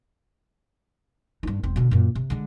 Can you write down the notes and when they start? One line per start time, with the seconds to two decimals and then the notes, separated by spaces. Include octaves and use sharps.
1.43 G2 D#4
1.63 E1 C4
1.76 B2 D3
1.91 F#2 A#2
2.15 C3
2.30 D3 G#3